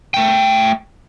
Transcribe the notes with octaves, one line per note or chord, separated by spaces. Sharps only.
A3 G5